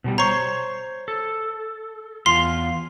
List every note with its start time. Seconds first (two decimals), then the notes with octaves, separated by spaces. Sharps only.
0.04 B2 F3 G3
0.18 C5 C#5 A#5 C#6
1.08 A4
2.26 E2 F4 F5 C6